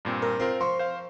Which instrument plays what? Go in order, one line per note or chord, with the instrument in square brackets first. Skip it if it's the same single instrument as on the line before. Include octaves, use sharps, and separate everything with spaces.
[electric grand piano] G2 A#2 C4
[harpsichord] A#4
[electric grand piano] C4 F4 A#4 [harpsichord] C5
[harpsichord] F3 [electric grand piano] C6 C#6
[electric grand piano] C5 F5